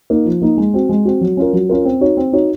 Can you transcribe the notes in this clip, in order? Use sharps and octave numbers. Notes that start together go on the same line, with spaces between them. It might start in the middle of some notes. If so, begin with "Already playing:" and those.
A#3 D#4
F3
A#3 D#4
G#3
C4 F#4
G#3
C4 F#4
F#3
C#4 F4 A#4
F#3
C#4 F4 A#4
C4
D#4 F#4 C#5
C4
D#4 F#4 C#5